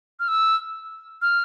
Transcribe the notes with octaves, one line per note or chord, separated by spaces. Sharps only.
F6
E6
F6